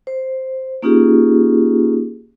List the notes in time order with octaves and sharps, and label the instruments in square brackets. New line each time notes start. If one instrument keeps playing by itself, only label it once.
[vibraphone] C5
A#3 C#4 D#4 F4 G4 G#4